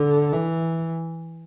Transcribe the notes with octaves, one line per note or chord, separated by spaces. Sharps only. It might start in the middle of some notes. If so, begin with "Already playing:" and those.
Already playing: D3
E3